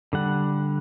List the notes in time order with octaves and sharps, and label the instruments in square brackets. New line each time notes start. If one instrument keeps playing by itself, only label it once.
[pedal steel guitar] D3 G3 F#5